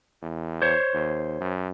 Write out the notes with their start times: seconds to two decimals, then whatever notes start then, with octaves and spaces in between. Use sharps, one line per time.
0.22 E2
0.62 C5 C#5
0.93 D#2
1.41 F#2